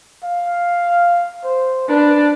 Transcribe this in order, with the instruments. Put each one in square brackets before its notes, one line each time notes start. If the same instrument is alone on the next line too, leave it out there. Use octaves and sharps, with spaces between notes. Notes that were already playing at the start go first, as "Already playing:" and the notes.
[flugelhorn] F5
C5
[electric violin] D4 [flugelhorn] B4